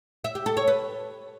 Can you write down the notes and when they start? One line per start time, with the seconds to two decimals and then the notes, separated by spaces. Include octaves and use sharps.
0.24 E5
0.35 G4
0.46 A4
0.57 C#5
0.68 B4